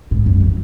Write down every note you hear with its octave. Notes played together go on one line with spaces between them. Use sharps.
G#2
F#2
E3